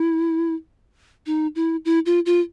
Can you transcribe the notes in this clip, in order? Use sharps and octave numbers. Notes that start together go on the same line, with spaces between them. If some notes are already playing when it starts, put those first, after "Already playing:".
Already playing: E4
D#4
E4
E4
F4
F4